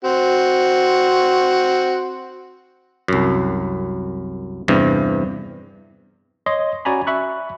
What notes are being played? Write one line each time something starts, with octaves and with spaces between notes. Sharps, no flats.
C4 F#4
C2 F#2
E2 G2 C3
C#5 D#5 C6
C#4 F#4 D5 G#5 A#5 B5
E5 B5 C#6 F#6